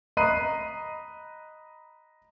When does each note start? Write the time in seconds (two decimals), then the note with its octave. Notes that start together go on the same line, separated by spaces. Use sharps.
0.17 D#5 A#5 B5 F#6 C7 D#7